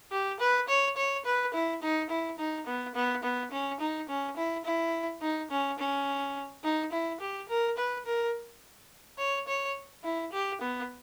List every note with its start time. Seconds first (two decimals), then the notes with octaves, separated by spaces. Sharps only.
0.12 G4
0.40 B4
0.69 C#5
0.97 C#5
1.25 B4
1.54 E4
1.82 D#4
2.10 E4
2.39 D#4
2.67 B3
2.95 B3
3.23 B3
3.52 C#4
3.80 D#4
4.09 C#4
4.37 E4
4.65 E4
5.22 D#4
5.51 C#4
5.79 C#4
6.64 D#4
6.92 E4
7.21 G4
7.49 A#4
7.78 B4
8.06 A#4
9.19 C#5
9.48 C#5
10.04 E4
10.33 G4
10.61 B3